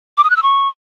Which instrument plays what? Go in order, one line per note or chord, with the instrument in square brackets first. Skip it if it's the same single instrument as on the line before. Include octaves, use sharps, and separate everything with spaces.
[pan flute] D6
D#6
F#6
E6
C#6